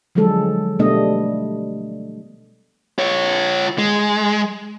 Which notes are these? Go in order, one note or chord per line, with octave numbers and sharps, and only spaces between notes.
D3 F3 F#3 G#3 A4
B2 G3 A3 B3 D4 D#5
F4 C#5
G#3